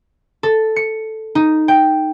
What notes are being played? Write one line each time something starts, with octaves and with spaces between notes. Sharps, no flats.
A4
C#7
D#4
G5